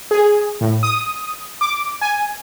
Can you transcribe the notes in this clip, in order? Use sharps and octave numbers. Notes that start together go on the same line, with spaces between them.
G#4
A2
D#6
D6
G#5